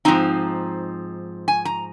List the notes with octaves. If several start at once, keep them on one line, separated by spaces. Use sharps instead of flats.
G#2 F3 C4 D#4 A#5
G#5
A#5